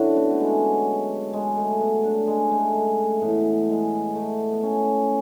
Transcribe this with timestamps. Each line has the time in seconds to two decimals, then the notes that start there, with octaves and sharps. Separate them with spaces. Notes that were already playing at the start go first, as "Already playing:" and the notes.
Already playing: F#2 D3 F#3 D4 E4 F#4
0.16 B3
0.31 A3
0.40 G#3
1.33 G#3
1.57 A3
1.81 B3
2.04 D4
2.27 G#3
2.51 A3
2.74 G#3
2.99 A3
3.21 A2 E3 B3
3.69 G#3
4.15 A3
4.52 B3
4.63 C#4